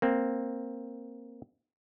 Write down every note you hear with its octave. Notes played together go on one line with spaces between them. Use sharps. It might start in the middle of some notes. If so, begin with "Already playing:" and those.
A#3 C4